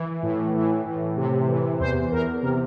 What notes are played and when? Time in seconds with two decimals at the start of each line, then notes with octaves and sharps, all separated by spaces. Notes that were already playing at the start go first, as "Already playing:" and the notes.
Already playing: E3
0.23 A2
0.54 E3
0.86 A2
1.17 C3
1.49 E3
1.80 E2 C5
2.12 E2 A#4
2.43 C3 A#4